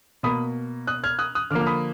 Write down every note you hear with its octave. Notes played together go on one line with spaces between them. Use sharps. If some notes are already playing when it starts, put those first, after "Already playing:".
B2 A#3 B5 D#6
D#6 F#6
F6 G#6
D#6 F#6
D#6 F#6
D3 F3 A#3 D6 F6
F6
B5 D#6